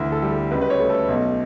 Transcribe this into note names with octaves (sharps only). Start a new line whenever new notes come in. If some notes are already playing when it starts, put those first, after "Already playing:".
Already playing: D2 E3
A4
G3
A4
C#2 B4
B4
C#5
A3
A4
B1